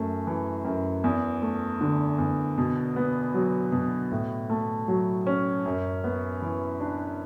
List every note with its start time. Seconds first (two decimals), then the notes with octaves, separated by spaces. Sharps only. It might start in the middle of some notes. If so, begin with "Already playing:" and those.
Already playing: F#2 A3
0.27 E3
0.65 F#2
1.04 E2
1.42 A3
1.81 D3
2.18 E2
2.58 B2
2.96 B3
3.34 F#3
3.72 B2
4.12 A2
4.50 A3
4.88 F#3
5.27 C#4
5.65 F#2
6.04 B3
6.42 E3
6.80 D4